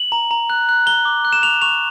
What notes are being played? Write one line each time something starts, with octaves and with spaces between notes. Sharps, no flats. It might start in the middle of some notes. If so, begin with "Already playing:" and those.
Already playing: F#7
A#5
A#5
F#6
F#6
A#5 G7
D6
F#6
E7
C#6 F7
C#6 F7